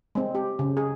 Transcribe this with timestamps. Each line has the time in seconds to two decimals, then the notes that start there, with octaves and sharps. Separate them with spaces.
0.15 G#3 C4
0.35 G4
0.59 C#3
0.77 G#4